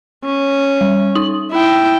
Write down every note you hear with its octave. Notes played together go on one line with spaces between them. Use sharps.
C#4
G3
D#4 D#6 F#7
E4 G5